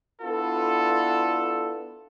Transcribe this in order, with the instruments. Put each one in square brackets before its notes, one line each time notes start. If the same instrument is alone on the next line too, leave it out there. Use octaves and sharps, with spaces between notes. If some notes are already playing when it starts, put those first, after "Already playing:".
[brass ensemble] B3 D4 E4 F4 A4